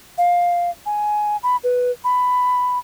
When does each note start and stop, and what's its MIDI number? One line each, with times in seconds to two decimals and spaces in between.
0.18 0.70 77
0.86 1.37 80
1.43 1.57 83
1.64 1.91 71
2.04 2.79 83